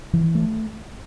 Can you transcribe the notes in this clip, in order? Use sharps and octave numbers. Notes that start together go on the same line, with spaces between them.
E3
A3